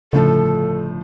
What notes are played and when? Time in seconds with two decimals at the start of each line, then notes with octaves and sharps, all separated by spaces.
0.13 G1 A2 C#3 F3 A4